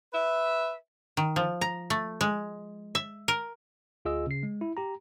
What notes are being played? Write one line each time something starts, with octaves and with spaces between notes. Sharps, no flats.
B4 E5
D#3
F3
A#5
A3
G#3
E5
A#4
D2 F4 G#4 D#5 E6
C#3 C7
G#3
E4
G4 A#5